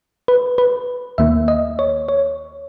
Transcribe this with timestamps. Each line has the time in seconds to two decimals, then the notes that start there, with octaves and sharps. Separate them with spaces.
0.28 B4
0.58 B4
1.18 D#2 D#3 A#3 E5
1.48 D#5
1.79 C#5
2.09 C#5